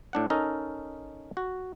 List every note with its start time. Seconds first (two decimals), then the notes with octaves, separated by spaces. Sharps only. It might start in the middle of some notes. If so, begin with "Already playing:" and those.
0.13 A2 D4 F#5
0.30 C#4 D#4 A4 A#4 D#5
1.37 F#4